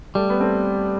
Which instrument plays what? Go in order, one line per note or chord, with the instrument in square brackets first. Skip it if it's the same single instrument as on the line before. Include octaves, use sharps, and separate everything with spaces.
[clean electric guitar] G3 [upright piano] A3
[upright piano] B3
A3 C4